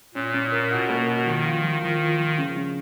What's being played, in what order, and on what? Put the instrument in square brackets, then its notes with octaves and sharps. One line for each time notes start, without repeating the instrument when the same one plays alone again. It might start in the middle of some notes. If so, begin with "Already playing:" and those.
[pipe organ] A#2 [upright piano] C#4
[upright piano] C#4
A#4
[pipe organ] B2 [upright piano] F#4
[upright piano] A#3
F#4
[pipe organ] D#3 [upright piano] F3
[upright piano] F4
F3
[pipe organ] D#3 [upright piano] F3
[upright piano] F4
F3
C#3
C#3